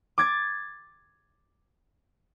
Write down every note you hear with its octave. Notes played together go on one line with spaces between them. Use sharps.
D6 G#6 A6